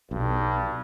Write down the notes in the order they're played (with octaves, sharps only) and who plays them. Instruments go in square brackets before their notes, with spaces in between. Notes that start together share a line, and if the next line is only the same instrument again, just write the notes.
[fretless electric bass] B1 [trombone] G2